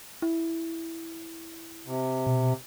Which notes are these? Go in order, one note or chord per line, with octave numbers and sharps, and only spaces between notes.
E4
C3
B2